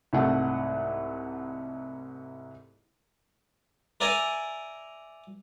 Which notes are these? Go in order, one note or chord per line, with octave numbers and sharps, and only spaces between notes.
C2 G#2 A3 F#5
A#4 D5 E5 G#5 A#5